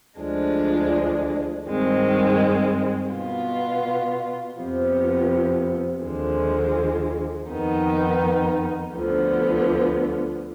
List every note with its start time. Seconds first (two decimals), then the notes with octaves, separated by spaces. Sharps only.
0.21 D2 D3 F3 G#3 D4
1.66 G2 D#3 G#3 C4
3.12 B2 B3 F4
4.58 F2 C3 F3 B3
6.04 D#2 D3 F3 G#3
7.50 F2 D#3 B3 D#4
8.96 D2 D3 F3 B3